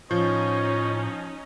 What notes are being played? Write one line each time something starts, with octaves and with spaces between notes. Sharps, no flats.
A2 F3 C#4 D#4 C#5 D#5